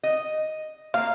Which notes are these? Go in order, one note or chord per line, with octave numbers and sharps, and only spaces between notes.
D#5
A#3 F5